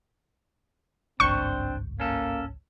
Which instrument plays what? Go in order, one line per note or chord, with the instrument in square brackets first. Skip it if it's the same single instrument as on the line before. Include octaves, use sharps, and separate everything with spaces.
[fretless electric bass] G#1 C#2 G2 [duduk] C4 [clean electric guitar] D4 C5 [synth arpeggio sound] C#6
[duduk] A#3 [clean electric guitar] C#4 A4